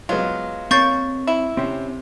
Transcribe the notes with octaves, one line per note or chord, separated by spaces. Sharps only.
F#3 G#3 B3 F4
A#3 C4 A#4 C#5 C#6 G6 A6
E4
C3 C4 C#4 C5